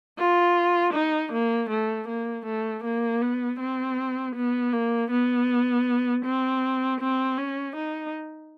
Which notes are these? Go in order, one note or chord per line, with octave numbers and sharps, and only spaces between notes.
F4
D#4
A#3
A3
A#3
A3
A#3
B3
C4
B3
A#3
B3
C4
C4
C#4
D#4